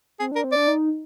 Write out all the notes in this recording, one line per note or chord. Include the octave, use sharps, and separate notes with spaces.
C4 G#4
D4 A#4
C4
D4 D5
D#4